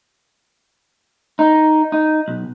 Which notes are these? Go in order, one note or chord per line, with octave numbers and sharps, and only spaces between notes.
D#4
D#4
B1